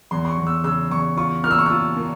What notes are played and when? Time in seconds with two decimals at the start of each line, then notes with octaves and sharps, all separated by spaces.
0.11 E2 C6
0.25 C6
0.29 C#6
0.38 E2
0.47 E6
0.64 C#3 E6
0.91 E2 C#6
1.17 F4 C#6
1.44 A#2 F6
1.51 E6
1.59 C#6
1.66 F4 E6
1.97 A#2